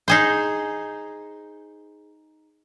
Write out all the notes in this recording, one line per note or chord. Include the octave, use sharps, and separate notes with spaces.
D#4 G#4 C5